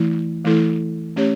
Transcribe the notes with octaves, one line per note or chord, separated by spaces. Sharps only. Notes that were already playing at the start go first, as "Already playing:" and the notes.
Already playing: E3 A3 E4
E3 A3 E4 A4
A3 C#4 G4 C#5